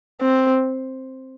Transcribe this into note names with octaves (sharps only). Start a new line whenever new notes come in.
C4